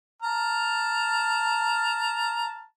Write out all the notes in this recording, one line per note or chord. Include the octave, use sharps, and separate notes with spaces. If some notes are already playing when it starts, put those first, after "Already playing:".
A5 A#5 F6